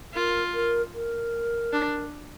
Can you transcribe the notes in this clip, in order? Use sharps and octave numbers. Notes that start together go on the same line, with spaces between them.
F4 A#4
A#4
A#4
D4